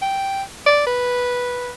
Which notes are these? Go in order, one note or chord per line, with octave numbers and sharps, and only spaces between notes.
G5
D5
B4